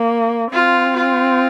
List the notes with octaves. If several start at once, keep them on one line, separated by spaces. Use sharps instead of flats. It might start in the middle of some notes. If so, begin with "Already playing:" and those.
Already playing: A#3
C4 F4
F4